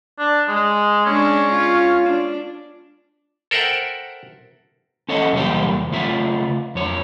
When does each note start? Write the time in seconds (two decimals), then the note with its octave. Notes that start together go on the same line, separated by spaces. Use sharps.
0.18 D4
0.48 G#3
1.06 G#3 C#4 D4
1.51 F4
2.06 D4
3.51 A4 A#4 C5 E5 F#5 G5
5.09 C#4 A4 C#5 D#5
5.33 E2 C3 G3 A#3 G4 G5
5.91 C#3 A3 F4 C5 E5
6.75 F2 C#5